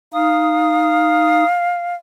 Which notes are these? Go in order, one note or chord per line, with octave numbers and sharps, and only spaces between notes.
D#4 F5 D#6